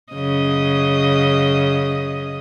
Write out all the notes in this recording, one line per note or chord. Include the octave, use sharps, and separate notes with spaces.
F#2 C#3 D#5